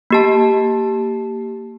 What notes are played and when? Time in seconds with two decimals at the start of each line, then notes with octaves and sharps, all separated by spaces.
0.11 A#3 G4 A5